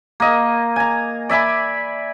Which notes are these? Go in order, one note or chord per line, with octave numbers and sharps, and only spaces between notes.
A#3 D#5
G#5 A#5
D5 E5 G#5 B5